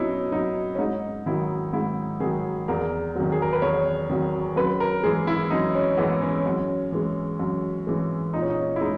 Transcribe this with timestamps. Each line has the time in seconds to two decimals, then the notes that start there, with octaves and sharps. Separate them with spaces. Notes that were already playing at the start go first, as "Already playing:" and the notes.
Already playing: B2 F#3 B3 C#4 D#4 E4
0.32 F#3 D#4
0.75 C#4
0.79 G#2 D#4
1.26 D#3 F#3 E4
1.73 G#2 E4
2.20 D#3 F#3 G#4
2.68 E2 A#4
3.15 D#3 F#3
3.32 G#4
3.42 A#4
3.53 B4
3.62 E2 C#5
4.10 D#3 F#3
4.56 F#2 B4
4.80 A#4
5.03 E3 G#3 G#4
5.27 E4
5.50 F#2 D#4
5.75 C#4
5.98 E3 G#3 B3
6.22 C#4
6.46 F#2
6.92 E3 G#3
7.39 F#2
7.87 E3 G#3
8.34 A#2 D#4
8.42 C#4
8.50 D#4
8.76 E4
8.81 G#3 D#4